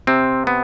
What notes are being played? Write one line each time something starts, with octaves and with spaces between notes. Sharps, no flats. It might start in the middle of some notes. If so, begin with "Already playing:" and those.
C3 C4
B3